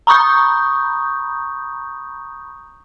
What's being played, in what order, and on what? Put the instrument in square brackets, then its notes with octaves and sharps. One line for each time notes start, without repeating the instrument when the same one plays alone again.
[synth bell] A#5 B5 C#6 D#6 G6